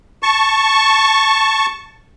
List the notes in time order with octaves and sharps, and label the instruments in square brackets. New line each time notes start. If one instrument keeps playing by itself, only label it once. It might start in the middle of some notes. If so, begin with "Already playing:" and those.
[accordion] A5 C#6